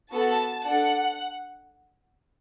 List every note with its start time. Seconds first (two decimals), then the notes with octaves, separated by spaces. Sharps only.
0.12 B3 F#4 A4 A5
0.64 D4 A4 F#5